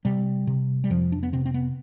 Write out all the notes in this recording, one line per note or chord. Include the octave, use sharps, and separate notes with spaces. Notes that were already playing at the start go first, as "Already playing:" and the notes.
C3 G3
C3
G3
F2 F3
D4
B3
C3 C4
C4
B3